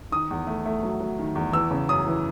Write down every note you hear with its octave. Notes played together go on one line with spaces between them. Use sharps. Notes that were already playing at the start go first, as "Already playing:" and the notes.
D#3 D#6
E2
A3
A3
F#3
F#3
D#3
E2
E3 E6
C#3
F#2 D#6
E3